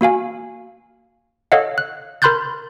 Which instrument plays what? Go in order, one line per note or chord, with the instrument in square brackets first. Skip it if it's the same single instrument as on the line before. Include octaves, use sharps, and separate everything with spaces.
[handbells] A#3 F#4 F5 G#5
A4 C#5 D#5 F5 F#5
F#6
A#4 B5 C6 F#6 G6 A6